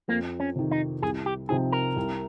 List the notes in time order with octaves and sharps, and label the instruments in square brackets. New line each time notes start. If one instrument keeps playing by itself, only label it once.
[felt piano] F2 [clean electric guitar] A#3
[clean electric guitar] C#4
[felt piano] C3 D#3
[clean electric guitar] D#4
[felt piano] C2 [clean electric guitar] G#4
[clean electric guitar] G4
[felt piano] C3 F3 C4 D#4 [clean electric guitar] G#4
[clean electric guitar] A#4
[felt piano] C2